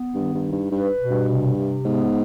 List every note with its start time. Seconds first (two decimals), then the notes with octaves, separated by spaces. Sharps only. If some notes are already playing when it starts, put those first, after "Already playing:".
Already playing: B3
0.15 G2 D#3
0.34 G2
0.44 D#4
0.52 G2
0.71 G2 B4
1.00 B2
1.10 G2
1.29 C3
1.58 C3
1.85 G#2 B3